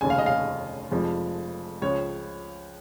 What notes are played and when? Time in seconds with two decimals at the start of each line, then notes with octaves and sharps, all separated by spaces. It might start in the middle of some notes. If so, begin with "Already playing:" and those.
0.01 F1 D#2 C#3 G#5
0.10 F5
0.18 D#5
0.26 F5
0.91 F1 F2 F3 G#3
1.82 C#2 C#3 F3 C#5